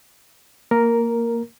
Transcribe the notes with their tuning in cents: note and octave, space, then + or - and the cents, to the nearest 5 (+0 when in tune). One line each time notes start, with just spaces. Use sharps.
A#3 -10 A#4 +0